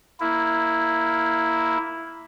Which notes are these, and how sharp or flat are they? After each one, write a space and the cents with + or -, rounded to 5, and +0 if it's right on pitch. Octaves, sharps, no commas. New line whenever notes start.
A#3 +0 E4 +0